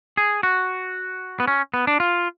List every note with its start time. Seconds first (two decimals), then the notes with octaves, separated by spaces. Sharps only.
0.17 G#4
0.43 F#4
1.40 B3
1.48 C#4
1.74 B3
1.87 D4
2.00 F4